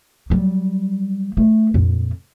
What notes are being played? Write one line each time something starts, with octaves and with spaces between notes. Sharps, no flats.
F#3 G3
A3
F2 A#2